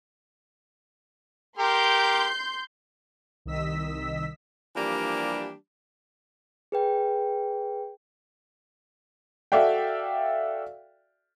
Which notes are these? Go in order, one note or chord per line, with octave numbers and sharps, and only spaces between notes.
G4 A#4 C6 G6
C2 D#3 D#5 E6 B6
E3 F3 G3 A#3 D4 G4
G#4 B4 G5
F#4 A4 D5 E5 F5 G5